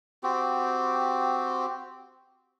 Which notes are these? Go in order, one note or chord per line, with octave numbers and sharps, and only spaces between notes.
C4 F#4 G4